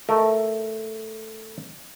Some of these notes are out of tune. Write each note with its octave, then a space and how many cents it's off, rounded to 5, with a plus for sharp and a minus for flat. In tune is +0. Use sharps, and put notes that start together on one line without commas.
A3 +0 A#4 +0 D#5 +30